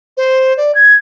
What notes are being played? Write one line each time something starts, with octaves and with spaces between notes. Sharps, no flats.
C5
D5
G#6